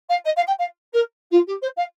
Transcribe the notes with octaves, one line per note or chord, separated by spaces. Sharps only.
F5
D#5
F5
G5
F5
A#4
F4
G4
C5
F5